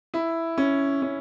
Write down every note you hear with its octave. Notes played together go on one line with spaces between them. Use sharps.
E4
C#4
C#4